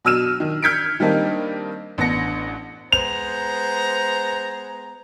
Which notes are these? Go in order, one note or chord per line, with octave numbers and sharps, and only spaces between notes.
B2 F#3 E6 F6 D#7 E7
D#3
F6 G6 G#6 B6 C#7 D7
D#3 G3 A#3 C4 D4 D#4
A1 B3 D4 A#6 C#7
G#3 B3 C5 A#5 F7